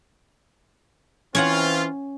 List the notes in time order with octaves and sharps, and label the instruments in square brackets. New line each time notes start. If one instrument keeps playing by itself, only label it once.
[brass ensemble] E3 C4 F4 [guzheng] C#4 C#5 F#5